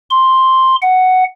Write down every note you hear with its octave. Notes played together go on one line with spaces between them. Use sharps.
C6
F#5